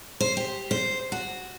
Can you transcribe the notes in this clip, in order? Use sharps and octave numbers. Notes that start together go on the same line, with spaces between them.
C5
G4
C5
F#4